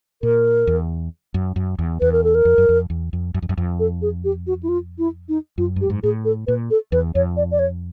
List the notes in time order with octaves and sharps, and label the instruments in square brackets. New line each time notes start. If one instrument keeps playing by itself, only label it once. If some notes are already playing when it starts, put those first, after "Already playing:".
[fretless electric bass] A#2 [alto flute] A#4
[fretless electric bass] E2
F#2
F#2
E2
[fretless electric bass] E2 [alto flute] B4
[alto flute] A#4
A4
A#4
[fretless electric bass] F2
F#2
F2
E2
F2
F#2
F2
F#2
F2
[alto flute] A4
G#4
G4
F#4
E4
F4
E4
D#4
[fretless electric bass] F#2 [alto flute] F4
[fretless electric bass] G2 [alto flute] G4
[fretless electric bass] G#2
[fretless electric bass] A2 [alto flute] G#4
[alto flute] A4
[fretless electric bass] A#2 [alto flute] B4
[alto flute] A4
[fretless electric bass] E2 [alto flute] B4
[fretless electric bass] F2 [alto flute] C#5
[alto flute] D5
D5
C#5